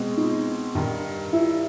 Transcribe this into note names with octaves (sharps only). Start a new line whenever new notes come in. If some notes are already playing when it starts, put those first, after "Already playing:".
Already playing: B2 G#3 C4
D#4
G2 D#3 G3
E4